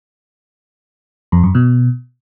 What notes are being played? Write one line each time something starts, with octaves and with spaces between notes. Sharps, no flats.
F2
F#2
B2